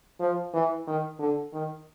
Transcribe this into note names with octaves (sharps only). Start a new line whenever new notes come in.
F3
E3
D#3
D3
D#3